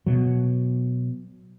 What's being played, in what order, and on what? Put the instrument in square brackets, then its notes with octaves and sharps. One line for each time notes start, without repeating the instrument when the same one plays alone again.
[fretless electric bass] B2 F#3